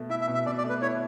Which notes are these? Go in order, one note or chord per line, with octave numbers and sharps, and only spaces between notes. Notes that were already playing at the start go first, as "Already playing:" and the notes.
Already playing: B2 A3
E4 E5
E5
B2
E5
B2 D5
D5
A3
B4
E4 C#5